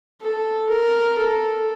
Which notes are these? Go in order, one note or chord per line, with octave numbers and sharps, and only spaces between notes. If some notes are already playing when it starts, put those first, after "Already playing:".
A4
A#4
A4